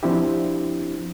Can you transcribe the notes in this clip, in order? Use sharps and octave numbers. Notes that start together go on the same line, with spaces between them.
F3 C4 D4 E4 G4